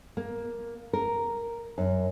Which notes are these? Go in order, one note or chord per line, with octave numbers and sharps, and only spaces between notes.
A#3
A#4
F#2